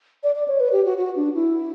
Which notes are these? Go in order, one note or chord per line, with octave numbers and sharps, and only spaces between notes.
D5
D5
C#5
B4
G4
F#4
F#4
D4
E4